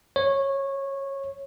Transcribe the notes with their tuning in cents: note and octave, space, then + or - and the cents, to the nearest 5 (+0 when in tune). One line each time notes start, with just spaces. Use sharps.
C#5 -15